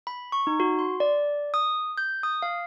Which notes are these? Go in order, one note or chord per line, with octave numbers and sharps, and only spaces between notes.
B5
C#6
D#4
F#4
C6
D5
D#6
G6
D#6
F5